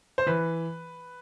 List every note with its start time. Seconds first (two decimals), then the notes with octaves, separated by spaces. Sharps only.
0.18 C5
0.26 E3 B4